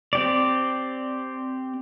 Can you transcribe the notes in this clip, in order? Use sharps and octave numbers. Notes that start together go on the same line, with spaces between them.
C4 G4 D5